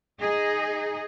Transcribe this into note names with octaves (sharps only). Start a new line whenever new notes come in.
D#4 G#4 D#5